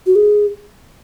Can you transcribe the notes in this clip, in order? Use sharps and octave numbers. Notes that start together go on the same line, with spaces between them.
F#4
G#4